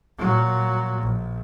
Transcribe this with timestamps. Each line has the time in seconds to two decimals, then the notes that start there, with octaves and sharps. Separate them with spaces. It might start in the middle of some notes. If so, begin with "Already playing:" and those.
0.18 A#2 F#3
1.02 A#1